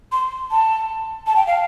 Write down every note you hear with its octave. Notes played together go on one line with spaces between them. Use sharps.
C6
A5
A5
G5
F5